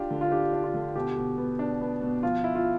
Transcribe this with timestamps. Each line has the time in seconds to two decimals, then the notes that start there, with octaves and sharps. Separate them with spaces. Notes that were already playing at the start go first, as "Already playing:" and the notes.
Already playing: D4 F4 G4
0.10 D3
0.21 F4
0.32 D4 G4
0.53 D4
0.64 F4
0.74 D3
0.96 B2 G4
1.17 B2
1.38 B3
1.59 D4
1.81 B3
2.02 B2
2.23 F3 F4
2.44 E4
2.55 F4